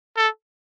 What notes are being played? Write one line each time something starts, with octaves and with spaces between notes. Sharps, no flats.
A4